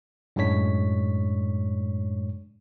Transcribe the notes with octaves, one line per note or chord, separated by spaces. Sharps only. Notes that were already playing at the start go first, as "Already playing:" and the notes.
F#2 A2 G#3 D4 C#5 B6